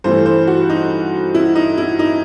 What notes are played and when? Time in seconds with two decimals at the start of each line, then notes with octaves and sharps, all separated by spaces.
0.04 G2 E3 A3 C5
0.26 C5
0.47 F#4
0.70 D#4
1.35 E4
1.55 D#4
1.77 E4
1.99 D#4